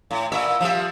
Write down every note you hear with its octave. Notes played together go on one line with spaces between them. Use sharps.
A2
A#2 E5
F3 G3 E5